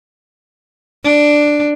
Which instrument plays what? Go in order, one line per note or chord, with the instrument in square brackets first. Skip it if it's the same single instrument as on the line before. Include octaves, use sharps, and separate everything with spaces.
[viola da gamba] D4